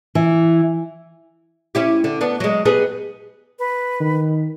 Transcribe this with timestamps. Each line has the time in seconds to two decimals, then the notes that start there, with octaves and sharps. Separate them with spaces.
0.15 E3
1.75 C#4 E4 G4
2.04 D3
2.21 B3 D4
2.40 F#3 G#3
2.65 G3 B3 G#4
3.59 B4
4.00 D#3